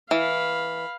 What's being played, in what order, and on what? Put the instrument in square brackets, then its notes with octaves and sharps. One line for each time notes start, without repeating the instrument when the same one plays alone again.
[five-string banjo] E3 [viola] F5 B5